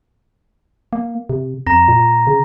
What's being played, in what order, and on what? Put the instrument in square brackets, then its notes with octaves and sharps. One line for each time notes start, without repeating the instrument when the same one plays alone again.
[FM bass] A#3
C3
[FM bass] F2 [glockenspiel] A#5 A#6
[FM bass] A#2
C#3